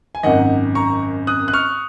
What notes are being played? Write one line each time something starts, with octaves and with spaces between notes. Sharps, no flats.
G#5
G#1 F#2 D#3 D#5 F#5
A#5 C#6
D#6 F#6
F#6
C#6 F6